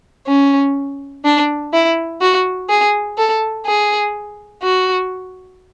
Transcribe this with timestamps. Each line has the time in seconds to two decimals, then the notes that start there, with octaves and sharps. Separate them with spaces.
0.28 C#4
1.25 D4
1.73 E4
2.21 F#4
2.69 G#4
3.18 A4
3.66 G#4
4.63 F#4